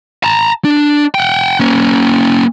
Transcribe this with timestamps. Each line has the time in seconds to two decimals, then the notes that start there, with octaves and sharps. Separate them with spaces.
0.24 A5 A#5
0.64 D4
1.15 F#5 G5
1.60 A#3 C#4